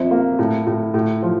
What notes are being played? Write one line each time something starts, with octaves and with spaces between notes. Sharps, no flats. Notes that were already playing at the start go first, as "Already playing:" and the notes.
Already playing: F2 C5 E5
A#3
A2
A2
A2
F3